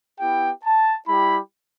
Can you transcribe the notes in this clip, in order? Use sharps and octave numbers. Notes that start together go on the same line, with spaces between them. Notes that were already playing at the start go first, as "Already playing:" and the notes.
B3 E4 G4 G5
A5
G3 E4 G4 B5